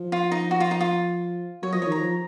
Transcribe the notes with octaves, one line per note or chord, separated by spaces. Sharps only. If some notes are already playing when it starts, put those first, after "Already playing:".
Already playing: F3
F4
D#4
F#4
F4
D#4
F4
F#3 C#5
F3 D#5
D#3 C#5
A#5
F3